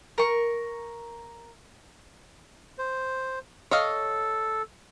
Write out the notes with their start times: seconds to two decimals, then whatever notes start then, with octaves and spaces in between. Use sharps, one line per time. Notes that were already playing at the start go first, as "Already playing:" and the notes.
0.18 A#4 C#6
2.78 C5
3.71 A4 C#5 D#5 F5